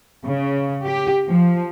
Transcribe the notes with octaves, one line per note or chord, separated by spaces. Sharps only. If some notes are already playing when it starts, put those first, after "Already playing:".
C#3
G4
F3